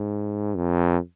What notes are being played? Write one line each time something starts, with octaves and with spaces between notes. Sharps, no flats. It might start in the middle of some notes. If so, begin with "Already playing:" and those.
Already playing: G#2
F2